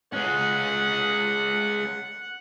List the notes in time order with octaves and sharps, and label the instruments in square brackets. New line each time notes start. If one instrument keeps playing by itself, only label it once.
[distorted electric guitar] G#3 C#4 [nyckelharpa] F#5